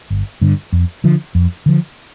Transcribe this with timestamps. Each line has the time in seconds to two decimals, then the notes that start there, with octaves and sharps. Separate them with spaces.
0.10 G1
0.41 G2 D3
0.72 F2
1.04 D3 F3
1.35 F2
1.66 D3 F3